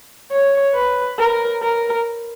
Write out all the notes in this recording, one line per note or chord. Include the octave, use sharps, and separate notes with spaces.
C#5
B4
A#4
A#4